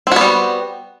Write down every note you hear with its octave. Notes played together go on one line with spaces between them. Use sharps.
G3 B3 C4 F#4